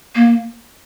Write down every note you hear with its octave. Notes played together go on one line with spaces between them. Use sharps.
A#3